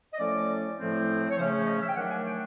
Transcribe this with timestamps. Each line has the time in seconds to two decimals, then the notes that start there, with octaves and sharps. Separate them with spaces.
0.14 D#5
0.18 A2 F3 A3 C#4 D5
0.77 A2 F3 A3 C4
1.30 C#5
1.37 C#3 F3 A3 C#4 C5
1.51 C#5
1.66 D#5
1.81 E5
1.88 G5
1.95 D#3 F#3 A3 D4 F#5
2.10 G#5
2.26 G5